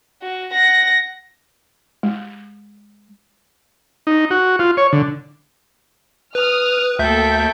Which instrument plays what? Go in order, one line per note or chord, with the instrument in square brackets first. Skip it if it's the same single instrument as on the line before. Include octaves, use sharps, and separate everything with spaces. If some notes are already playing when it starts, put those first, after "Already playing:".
[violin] F#4
F#5 A#6
[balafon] G#3
[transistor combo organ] D#4
F#4
F4
C#5
D3
[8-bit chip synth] B4 [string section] D#6 F6
[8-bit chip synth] D2 E5 G6 [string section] A#3 A4 G5